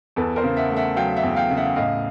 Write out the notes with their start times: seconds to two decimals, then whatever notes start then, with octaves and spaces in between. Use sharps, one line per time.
0.16 E2 A4 B4
0.36 A#4 C5
0.44 C#3
0.57 E5 F#5
0.70 A3
0.76 E5 F#5
0.96 F#3 F5 G5
1.16 E5 F#5
1.23 E2
1.36 F5 G5
1.50 C#3
1.56 E5 F#5
1.76 A2 D#5 F5